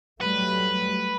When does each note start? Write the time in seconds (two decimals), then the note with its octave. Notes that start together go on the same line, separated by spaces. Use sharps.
0.21 F#3 G3 A3 B4